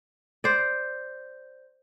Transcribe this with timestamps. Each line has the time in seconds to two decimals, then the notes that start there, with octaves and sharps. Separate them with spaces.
0.44 C5 D5